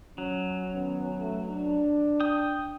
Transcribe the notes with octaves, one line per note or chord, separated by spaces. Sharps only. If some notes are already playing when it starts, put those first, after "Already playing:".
F#3 C#4
D#3 B3 C#4
A3
D4
G5 D#6